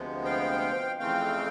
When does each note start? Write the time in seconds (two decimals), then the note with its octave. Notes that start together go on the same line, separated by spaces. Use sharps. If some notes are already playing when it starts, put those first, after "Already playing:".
Already playing: D2 C3 F3 G#3 B3
0.25 F5 G5
0.99 F2 C#3 E3 A3 C4 F5 G5